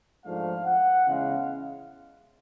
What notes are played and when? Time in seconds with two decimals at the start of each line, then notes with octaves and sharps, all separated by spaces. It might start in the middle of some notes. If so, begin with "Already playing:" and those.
0.24 G#2 F3 A3 D4 F5
0.65 F#5
1.06 E2 C#3 E3 G#3 F5